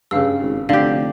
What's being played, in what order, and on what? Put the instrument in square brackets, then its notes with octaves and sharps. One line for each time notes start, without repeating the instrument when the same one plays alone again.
[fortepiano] G2 C#3 [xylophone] F5 E6
[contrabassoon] G#1
[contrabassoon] F1 [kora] D3 G4 [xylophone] F5